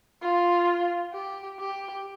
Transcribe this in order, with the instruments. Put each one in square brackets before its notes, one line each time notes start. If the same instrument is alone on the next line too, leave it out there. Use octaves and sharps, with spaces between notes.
[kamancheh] F4
G4
G4